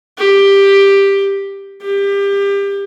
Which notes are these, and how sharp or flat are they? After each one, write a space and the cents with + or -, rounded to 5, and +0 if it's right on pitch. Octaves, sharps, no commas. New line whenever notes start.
G4 +10
G4 +25